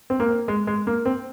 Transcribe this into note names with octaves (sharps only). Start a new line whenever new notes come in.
C4
A#3
G#3
G#3
A#3
C4